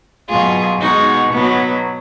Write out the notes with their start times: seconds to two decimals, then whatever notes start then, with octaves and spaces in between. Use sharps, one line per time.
0.29 B2 F#3 F4 G#4
0.81 B2 G#3 D#4 F#4
1.32 B2 F#3 B3